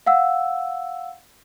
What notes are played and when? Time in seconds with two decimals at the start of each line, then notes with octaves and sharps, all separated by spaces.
0.06 F5 F#5 E6